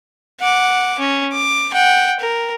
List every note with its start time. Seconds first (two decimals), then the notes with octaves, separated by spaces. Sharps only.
0.41 F#5 D6
0.99 C#4
1.33 D6
1.73 F#5 G5
2.20 A#4